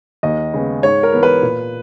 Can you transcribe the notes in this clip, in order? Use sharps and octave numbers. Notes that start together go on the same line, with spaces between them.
D#2 D#5
C#3 G#3 B3
G#2 C#5
A#4
E3 B3
B4
A#2